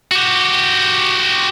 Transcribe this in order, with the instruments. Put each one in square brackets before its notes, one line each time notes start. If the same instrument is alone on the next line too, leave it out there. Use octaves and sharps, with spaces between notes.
[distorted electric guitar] F#4 G4